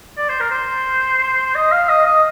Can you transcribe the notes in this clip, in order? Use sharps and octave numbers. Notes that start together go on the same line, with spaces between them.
D5
C5
A#4
C5
D#5
F5
D#5
D#5